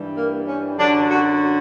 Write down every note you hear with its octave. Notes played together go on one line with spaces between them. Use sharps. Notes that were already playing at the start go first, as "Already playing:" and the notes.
Already playing: G2 E3 G3
A#3
C#4
F#2 D3 F#3 D4
F#4